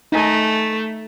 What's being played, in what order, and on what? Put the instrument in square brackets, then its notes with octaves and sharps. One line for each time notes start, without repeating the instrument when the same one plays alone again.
[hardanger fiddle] A3 [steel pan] D#4 G#5